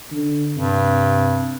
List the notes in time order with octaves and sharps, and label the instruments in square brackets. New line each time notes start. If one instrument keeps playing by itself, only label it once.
[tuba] D3
[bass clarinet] G2 [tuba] C3